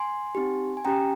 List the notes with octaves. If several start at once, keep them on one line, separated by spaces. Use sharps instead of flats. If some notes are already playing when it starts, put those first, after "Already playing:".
Already playing: G#5 C6
C4 D#4 G4
G#5
C#4 G4 G5 A#5